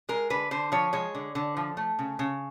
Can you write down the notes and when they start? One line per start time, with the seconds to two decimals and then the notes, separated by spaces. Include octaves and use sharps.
0.09 G#3 A#4
0.30 D3 B4
0.51 D3 C5
0.72 F3 C#5
0.93 G#3 C#5
1.15 D3
1.35 D3
1.57 F3
1.77 A3
1.99 C#3
2.19 C#3